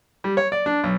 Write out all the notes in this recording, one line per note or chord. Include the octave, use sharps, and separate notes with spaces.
G3
C#5
D5
D4
B1